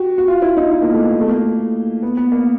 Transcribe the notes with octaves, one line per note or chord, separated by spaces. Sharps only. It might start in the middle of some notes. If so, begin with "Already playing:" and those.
Already playing: F#4 G4
F#4
F4
E4
D#4
D#4
A#3
A3
B3
A#3
A3
A#3
B3
B3
A#3